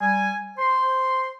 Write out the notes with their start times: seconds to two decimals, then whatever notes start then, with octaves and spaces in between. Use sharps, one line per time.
0.01 G3 G#5
0.58 C5 C6